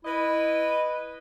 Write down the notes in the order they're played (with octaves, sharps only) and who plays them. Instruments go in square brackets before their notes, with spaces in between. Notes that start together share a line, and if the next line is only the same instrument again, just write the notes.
[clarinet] E4 [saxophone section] B4 D#5